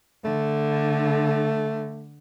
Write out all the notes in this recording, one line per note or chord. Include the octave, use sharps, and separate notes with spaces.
D3 A3